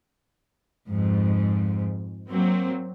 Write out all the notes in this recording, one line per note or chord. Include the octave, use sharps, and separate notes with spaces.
F2 G#2
F#3 A#3 C4